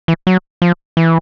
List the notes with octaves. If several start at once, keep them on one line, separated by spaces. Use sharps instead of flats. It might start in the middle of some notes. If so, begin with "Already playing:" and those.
E3
F#3
F3
E3